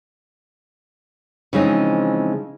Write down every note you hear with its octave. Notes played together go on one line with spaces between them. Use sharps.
C#3 E3 F3 G#3 C4 D#4